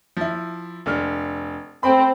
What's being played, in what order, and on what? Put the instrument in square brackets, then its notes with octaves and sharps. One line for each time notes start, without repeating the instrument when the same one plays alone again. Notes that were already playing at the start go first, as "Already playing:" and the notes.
[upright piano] F3 E4
F1 D3 F6
[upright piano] A3 G5 B5 [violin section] C4